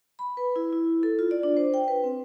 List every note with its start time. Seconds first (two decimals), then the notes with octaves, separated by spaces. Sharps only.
0.19 B5
0.37 B4
0.56 E4
0.73 E4
1.03 A4
1.19 F4
1.31 D5
1.43 D4
1.57 C5
1.74 G5
1.88 B4
2.04 C4